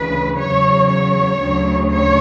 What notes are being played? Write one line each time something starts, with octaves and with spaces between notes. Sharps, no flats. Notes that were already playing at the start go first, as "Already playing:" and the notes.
Already playing: D2 C#3 E3 B4
E2 C#3 F#3 C#5
C#5
D2 C#3 F#3
C#5